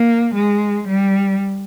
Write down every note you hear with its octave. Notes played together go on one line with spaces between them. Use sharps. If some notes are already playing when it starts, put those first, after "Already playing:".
Already playing: A#3
G#3
G3